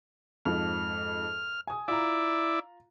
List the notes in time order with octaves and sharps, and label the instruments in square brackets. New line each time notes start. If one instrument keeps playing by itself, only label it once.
[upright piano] F2 G#2 F3 [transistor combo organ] F6
[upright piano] G#5 D#6
[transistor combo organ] E4 D5 [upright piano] F4 A#5